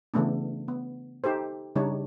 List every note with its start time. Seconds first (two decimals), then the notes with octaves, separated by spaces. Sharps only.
0.14 C#3 E3 A3 B3 D4
0.68 B3
1.24 D#4 G4 A4 C5
1.76 C#3 G3 D4 D#4 C#5